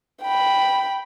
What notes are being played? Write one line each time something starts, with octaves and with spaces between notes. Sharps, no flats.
G5 B5